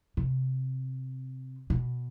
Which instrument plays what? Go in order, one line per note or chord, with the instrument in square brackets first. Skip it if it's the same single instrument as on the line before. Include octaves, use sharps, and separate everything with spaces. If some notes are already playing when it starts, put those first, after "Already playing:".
[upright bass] C3
B2